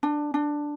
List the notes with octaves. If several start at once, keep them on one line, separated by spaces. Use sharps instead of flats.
D4
D4